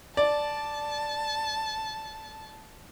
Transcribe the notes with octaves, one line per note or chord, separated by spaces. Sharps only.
D5 A5